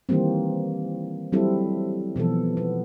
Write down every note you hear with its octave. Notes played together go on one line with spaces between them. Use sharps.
D#3 E3 G3 A#3 C4
F#3 G3 C4 E4 A4
B2 E3 F3 A4
B3